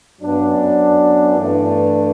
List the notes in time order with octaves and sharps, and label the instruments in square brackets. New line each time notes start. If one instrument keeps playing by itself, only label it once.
[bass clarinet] G2 [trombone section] F#3 B3 D4
[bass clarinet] F#2
[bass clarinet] G2 [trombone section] E3 A3 D4
[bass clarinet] G2